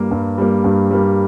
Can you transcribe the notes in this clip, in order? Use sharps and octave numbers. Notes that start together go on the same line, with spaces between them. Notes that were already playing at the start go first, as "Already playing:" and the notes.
Already playing: G2 G3 A#3
G2
G3 A#3
G2
G3 A#3